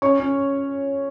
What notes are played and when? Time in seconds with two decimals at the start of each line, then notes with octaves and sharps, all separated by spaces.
0.02 C#4 C#5 C#6
0.20 C#4